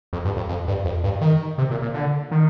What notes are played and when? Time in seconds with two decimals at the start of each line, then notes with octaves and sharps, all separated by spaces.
0.13 F2
0.25 G2
0.37 F2
0.49 F2
0.68 G2
0.85 F2
1.04 G2
1.21 D#3
1.58 C3
1.71 A#2
1.82 A#2
1.94 D3
2.31 D#3